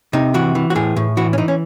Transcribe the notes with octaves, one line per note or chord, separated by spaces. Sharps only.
C3 D#4
E3 F#4
E3
F#4
A2 G#4
A2
E3 F#4
C#4
E3 D#4
C#4